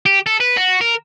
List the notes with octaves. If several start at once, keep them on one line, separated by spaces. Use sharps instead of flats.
G4
A4
B4
F#4
A#4